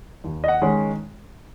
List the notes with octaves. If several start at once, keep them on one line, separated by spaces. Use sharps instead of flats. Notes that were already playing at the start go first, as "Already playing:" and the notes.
D#2
D#5
F#5
D#3 G#3 C#4